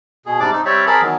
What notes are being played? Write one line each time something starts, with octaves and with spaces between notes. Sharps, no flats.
B2 G#4
G#2 C3 G3 D4 D5 D6
C4 D#4
G3 C4 G4 C#5 D5 E5
C4 G#4 A#4 A5 B5
D#3 E3 F#3 B3